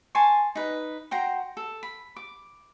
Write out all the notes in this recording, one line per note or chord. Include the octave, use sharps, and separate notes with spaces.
G#5 A5 C6 C#6
D#4 B4
F#4 G5 A#5 C6
A4
B5
D6